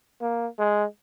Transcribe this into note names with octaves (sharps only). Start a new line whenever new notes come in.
A#3
G#3